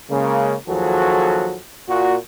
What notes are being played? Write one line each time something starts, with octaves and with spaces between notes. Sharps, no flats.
C#3 G#3 A#3
D#2 F3 F#3 F#4 G#4 A4
A#2 F#4